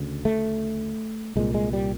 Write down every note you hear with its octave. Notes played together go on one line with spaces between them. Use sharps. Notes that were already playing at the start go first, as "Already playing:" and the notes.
Already playing: D2 C#3
A3
C2 A#2 G#3
G#3
G3